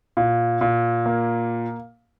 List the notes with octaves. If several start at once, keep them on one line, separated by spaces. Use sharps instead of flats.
A#2
A#2
A#3